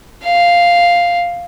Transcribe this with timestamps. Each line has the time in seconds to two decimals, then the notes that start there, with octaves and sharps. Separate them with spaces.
0.25 F5